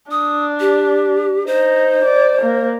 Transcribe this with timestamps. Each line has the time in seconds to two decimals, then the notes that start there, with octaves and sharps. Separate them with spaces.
0.11 D4 D#6
0.60 G4
1.47 D#4 C5
2.05 D5
2.42 A#3